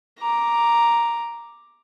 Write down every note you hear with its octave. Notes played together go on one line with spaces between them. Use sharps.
A#5 D6